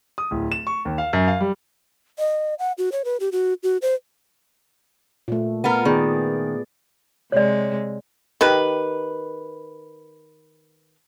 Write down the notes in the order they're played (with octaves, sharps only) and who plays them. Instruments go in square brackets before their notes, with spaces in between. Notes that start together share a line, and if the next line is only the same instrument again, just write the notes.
[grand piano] D#6
D1
E7
C#6
D#2
F5
F#2
F5
G3
[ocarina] D#5
F#5
F#4
C#5
B4
G4
F#4
F#4
C5
[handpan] A#2 A3
[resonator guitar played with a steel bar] B3 F4 A#4
[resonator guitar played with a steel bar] D#3 [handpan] B3 G#4 D5
[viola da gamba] C3 G#3 [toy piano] C#5 D5
[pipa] D#3 G4 B4